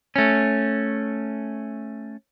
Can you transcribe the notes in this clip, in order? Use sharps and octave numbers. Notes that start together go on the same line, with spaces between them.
A3 C#4